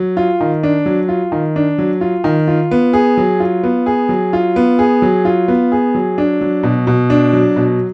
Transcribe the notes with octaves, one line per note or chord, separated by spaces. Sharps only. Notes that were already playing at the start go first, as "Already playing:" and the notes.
Already playing: F#3
F4
D#3
D4
F#3
F4
D#3
D4
F#3
F4
D#3
F4
B3
G#4
F#3
F4
B3
G#4
F#3
F4
B3
G#4
F#3
F4
B3
G#4
F#3
D4
F#3
B2
B2
D4
F#3
B2